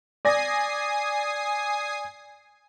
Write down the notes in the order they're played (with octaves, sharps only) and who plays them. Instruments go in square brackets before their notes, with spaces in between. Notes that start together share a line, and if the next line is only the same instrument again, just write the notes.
[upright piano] D5 A#6 [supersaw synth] G#5 D#6 C7